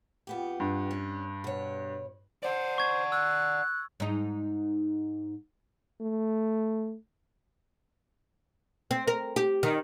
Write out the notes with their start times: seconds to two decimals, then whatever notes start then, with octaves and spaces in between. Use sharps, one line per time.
0.27 F2 B3 G4
0.60 G2
0.91 C#4
1.44 B2 C#5
2.43 C5 D5 F#5
2.78 C#6 G#6
3.12 E6 F#6
4.00 G#2 D#4
6.01 A3
8.91 C4
9.07 A#4
9.36 G4
9.63 D#3